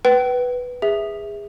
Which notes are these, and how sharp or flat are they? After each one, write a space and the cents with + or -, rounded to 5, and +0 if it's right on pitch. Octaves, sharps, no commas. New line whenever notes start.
B4 +0 G5 -40
G#4 -20 E5 -10